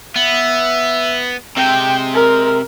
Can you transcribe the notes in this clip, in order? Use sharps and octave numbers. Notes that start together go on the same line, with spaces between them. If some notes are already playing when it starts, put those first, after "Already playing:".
B3 E5
C3 G#3 G5
A#4